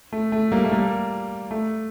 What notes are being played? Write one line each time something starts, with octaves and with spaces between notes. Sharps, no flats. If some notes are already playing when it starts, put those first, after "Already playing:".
A3
A3
G3 A#3
A3
G3 A#3
A3